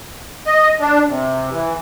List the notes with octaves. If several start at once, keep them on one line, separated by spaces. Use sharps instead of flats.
D#5
D4
C3
E3